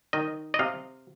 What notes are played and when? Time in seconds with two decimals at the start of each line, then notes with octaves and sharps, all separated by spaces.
0.13 D#3 D#5
0.54 D#5
0.59 C3 F5